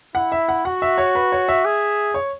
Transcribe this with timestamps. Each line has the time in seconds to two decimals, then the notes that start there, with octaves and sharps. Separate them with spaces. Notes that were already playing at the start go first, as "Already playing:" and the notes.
0.15 E4 F#5
0.32 E5
0.49 F#5
0.65 F#4 F#5
0.82 E5
0.98 C#5
1.15 B4
1.32 C#5
1.48 E5
1.65 G#4
2.14 C#5